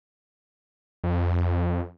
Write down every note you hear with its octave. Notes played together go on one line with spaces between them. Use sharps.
F2